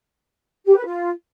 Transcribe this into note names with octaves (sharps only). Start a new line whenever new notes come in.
G4
B4
F4